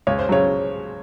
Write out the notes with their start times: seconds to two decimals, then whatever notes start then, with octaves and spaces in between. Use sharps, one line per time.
0.07 C#2 C#5
0.19 C5
0.29 C#3 F#3 C#5